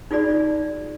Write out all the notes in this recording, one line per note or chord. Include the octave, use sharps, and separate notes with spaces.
D#4 F4 F#4 G#4 D5